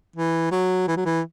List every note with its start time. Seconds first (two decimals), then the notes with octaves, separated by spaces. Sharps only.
0.16 E3
0.51 F#3
0.87 E3
0.97 F#3
1.05 E3